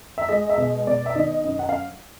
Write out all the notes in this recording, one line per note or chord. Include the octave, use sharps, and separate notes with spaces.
E5
G#3 D#5
E5
B2 D#5
B2 D5
E5
D#3 D#5
F#2
F#5
F5